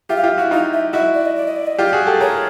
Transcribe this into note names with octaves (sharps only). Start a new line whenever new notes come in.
F4 G4 E5
F5
F4 G4 E5
E4 F#4 F5
D#4 F4 F5
E5
E4 F#4 D#5
D5
D#5
D5
D#5
D5
D#5
F4 G4 D5
F#4 G#4
G4 A4
G#4 A#4 C#5